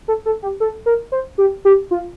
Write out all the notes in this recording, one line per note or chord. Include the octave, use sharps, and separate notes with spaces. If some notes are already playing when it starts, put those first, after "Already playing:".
A4
A4
G4
A4
A#4
C5
G4
G4
F4